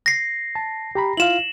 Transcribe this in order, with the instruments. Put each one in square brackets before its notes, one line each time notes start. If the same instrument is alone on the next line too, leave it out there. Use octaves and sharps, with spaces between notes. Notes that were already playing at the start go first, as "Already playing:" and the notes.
[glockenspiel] A#6 C7
[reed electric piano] A5
G4 A#5 B5
[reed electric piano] E4 F4 F5 [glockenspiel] E7 F#7